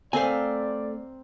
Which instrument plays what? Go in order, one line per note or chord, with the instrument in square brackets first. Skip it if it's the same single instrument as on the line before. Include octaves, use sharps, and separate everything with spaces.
[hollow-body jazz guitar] A3 G#5 [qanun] C4 A#4 F5 [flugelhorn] D5